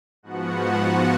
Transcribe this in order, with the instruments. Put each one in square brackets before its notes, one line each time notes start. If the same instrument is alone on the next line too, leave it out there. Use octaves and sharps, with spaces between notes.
[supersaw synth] G#2 F3 B3 F#4 F#5
F#4 F#5